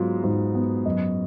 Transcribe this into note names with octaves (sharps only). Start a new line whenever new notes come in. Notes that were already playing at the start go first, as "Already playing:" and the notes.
Already playing: G#2 F#3 B3 F4
G#2
B3
F#2 D#5